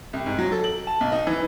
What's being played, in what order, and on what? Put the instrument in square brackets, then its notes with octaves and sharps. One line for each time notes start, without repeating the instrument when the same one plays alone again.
[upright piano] C2
G#2
F#3
A4
F#7
A5
B1
D#4
E3